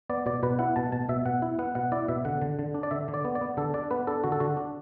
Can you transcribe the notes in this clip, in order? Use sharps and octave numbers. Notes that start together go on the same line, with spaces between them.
B3 D5
B2 D5
B2 B4
E4 F#5
B2 A5
B2 A5
B2 E5
B2 F#5
E4
B3 F#5
B2 F#5
E4 D5
B2 E5
D3 F#5
D3
D3
D4
D5
D3 E5
D3
D5
B3
D5
B3
D3 A4
D4 D5
B3 B4
D4 A4
D3 F#4
A4
D3 F#4
D4